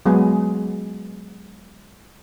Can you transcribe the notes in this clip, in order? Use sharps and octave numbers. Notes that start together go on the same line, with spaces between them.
F#3 G#3 B3 G#4